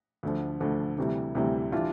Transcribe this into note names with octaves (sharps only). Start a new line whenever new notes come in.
D2 D3 F3
D2 D3 F3
D2 C3 E3 G3
D2 C3 E3 G3
E3 G3 D4 F4